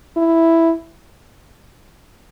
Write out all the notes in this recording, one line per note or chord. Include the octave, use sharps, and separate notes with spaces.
E4